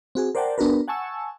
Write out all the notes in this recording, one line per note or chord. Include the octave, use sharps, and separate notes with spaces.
C4 F#4 G#4
A#4 C5 D5 F#5 G5 A5
B3 D4 F#4 A#4 B4
F#5 G#5 A5 C#6 E6